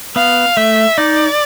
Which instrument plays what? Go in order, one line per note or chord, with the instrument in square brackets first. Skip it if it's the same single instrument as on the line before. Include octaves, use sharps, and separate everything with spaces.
[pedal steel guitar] B3 [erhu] F5
[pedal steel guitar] A3 [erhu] E5
[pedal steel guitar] D#4 [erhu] D5